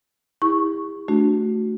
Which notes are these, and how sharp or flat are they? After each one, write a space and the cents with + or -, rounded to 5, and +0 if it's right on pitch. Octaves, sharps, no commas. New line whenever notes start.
E4 -10 G4 +45 C#6 +0
A3 +0 D4 +0 F#4 +0